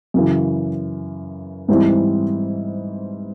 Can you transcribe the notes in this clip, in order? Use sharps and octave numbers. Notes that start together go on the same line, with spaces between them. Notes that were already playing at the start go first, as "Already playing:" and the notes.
F#2 C#3 E3
G#2 E3 G3 C4 E4